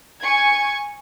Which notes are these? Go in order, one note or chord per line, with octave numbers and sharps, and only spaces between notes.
G#5 C#6 G#6